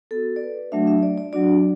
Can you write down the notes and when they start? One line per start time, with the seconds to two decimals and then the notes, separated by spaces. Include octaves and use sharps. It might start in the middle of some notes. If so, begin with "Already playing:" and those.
0.11 B3 F#4 A4
0.36 D5
0.41 B4
0.72 F#3 A3 D4 F#4 E5
0.87 E5
1.03 D5
1.18 D5
1.33 F#3 D4 F#4 D5